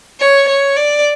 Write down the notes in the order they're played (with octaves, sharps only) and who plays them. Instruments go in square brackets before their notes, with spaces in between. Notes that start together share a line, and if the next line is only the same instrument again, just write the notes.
[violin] C#5
C#5
D5